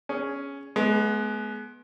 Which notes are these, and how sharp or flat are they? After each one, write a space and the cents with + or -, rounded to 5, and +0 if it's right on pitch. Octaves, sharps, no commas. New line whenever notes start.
C#4 +5 G#4 +0
G#3 +35 B3 -10